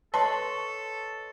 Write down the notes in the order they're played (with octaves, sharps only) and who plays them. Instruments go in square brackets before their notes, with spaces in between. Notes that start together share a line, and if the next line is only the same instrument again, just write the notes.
[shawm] A4 [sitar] B4 [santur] C#5 D#5 C6 [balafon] A5